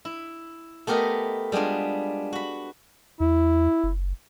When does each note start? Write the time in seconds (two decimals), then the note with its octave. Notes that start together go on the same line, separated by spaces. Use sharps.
0.05 E4
0.87 A3 B3 G4 A#4 B4 D#5
1.52 G3 G#3 B3 D4 F4
2.33 F#4 B5
3.20 E2 E4
3.84 F#1